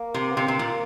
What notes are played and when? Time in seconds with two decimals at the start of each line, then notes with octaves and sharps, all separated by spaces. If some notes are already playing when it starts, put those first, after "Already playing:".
Already playing: A#3
0.14 C3
0.31 B3
0.37 C3 A#3
0.48 C3
0.59 A#2